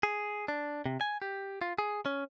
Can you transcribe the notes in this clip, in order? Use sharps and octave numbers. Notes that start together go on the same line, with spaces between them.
G#4
D4
C3
G#5
G4
F4
G#4
C#4